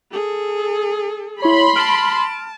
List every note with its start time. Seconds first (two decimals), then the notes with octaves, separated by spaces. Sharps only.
0.12 G#4 A4
1.42 E4 C#5 B5 C6
1.76 A5 F6 D7